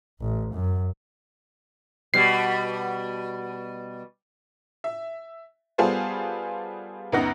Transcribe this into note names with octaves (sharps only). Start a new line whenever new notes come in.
A1
F#2
B2 G3 C7
E5
G3 B3 F4 G#4 A4 C5
C#2 F#2 B3 D#4 F#5 A#6